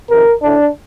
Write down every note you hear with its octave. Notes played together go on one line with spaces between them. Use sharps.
F2 C3 D#3 A#4
A2 A3 D4